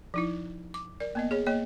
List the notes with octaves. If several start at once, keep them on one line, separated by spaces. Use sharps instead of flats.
F3 D#4 E4
D6
A#4 D5
A#3 B3 D#5
G#4 C#5
A#3 C#5 D#5